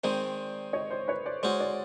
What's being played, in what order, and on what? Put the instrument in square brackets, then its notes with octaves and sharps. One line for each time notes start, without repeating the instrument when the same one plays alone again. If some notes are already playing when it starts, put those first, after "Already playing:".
[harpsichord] D#3 G#3 C4 [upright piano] C5 D5
[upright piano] C#5 D#5
C5 D5
B4 C#5
C5 D5
[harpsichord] G#3 C#4 F#4 [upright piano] C5 D5
[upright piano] C5 D5